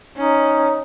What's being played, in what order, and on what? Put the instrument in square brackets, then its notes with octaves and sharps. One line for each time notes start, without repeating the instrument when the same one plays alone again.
[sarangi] C#4 [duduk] D#4